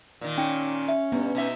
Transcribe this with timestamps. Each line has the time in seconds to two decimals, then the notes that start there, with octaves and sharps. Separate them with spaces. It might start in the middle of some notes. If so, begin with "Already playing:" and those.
0.21 A#2 D#3
0.38 C#4 D#4 G5
0.88 E5
1.12 G2 B3
1.35 B2 D#4 E5